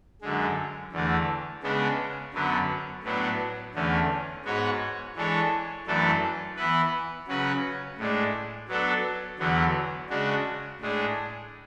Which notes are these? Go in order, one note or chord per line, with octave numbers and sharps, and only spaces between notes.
F#2 D3 G#3
E2 D3 A3
C#3 G#3 B3 D4
F#2 D3 F#3 B3
A2 F#3 B3 D4
E2 D3 A3 C#4
G#2 G#3 B3 F#4 C#5
E3 G#3 D4 A4 C#5
F#2 E3 A3 D4 A4
E3 B3 E4 B4
C#3 F#3 C#4 F#4 B4
A2 G#3 D4
F#3 B3 D4 A4
E2 D3 F#3 B3
C#3 G#3 D4 F#4
A2 G#3 D4 G#4